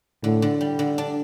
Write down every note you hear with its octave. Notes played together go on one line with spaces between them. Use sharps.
A2 D3
D3
G3
D3
D4